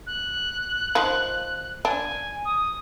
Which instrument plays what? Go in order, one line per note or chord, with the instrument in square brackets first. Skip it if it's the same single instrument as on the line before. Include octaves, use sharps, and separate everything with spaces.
[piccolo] F#6
[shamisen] D#3 F3
[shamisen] D4 [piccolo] G#5
[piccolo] D#6